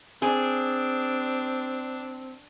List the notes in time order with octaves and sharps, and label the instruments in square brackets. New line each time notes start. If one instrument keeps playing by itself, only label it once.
[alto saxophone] C4 [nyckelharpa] D4 [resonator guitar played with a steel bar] G#4